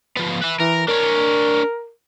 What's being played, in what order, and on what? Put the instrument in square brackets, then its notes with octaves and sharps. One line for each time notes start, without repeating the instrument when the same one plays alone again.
[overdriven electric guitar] F3 B3
B4 E5
[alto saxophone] E3 [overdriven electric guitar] A#4
[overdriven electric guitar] D4 C#5 [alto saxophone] A#4